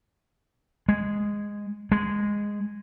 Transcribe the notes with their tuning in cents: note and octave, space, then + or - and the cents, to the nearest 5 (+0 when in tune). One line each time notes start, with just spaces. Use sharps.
G#3 -10
G#3 -10